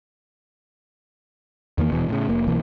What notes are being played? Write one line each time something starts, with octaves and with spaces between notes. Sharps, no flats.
E2 D#3 A#3
D#1 E2 B2 E3
A2 C#3
F1 A#3
B1 B2 E3 A#3